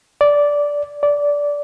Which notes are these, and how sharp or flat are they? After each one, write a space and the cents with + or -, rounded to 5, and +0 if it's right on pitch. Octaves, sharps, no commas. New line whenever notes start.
D5 -10
D5 -15